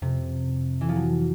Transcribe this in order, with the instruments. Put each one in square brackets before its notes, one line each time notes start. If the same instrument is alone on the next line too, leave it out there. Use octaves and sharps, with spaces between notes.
[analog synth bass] F2 [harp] C3
[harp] E3
F3
F#3